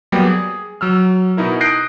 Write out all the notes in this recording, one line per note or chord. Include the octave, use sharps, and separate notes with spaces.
F#3 G3 A#3 B3 G4
G#4
F#3 E6 F6
B2 D#4 E4 A#4
D#6 F#6 G6 A#6 C7 D7